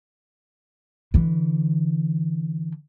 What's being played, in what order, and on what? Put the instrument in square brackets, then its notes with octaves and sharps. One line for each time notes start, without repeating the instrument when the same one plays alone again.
[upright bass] D3 E3